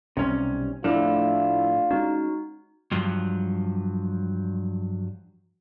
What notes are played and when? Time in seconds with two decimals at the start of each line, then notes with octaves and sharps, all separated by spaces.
0.17 B1 C3 G3 C#4
0.84 A2 F3 A3 D4 E4 F4 A4
1.91 G#3 C#4 D#4 F#4
2.91 G2 F3 F#3